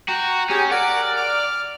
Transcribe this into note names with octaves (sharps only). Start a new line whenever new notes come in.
F#4 G5 A#5
C#4 G4 G#4 G5
A#4 D5 F#5
D6 F6